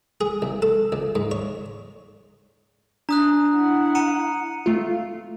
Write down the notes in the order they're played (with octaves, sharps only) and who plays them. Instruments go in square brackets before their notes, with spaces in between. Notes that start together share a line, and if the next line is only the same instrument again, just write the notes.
[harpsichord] G#4
C2
A4
C#2
G#2
C#5
[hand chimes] D4 [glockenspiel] A#5 D#6 F#6
[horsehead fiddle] E4 F#5
[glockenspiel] A#5 C#7 D#7
[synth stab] A3 F4